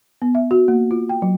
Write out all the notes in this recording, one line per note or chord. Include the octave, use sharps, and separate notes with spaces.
B3
E5
F#4
A#3
F4
G5
F#3